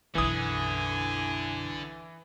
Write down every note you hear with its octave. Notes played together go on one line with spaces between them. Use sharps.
B1 F#2 D3 E3 G#5 D#6